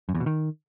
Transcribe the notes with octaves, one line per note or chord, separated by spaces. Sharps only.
F#2
E2
B2
D#3